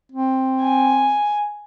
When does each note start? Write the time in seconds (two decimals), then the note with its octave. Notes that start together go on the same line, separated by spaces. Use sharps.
0.12 C4
0.62 G#5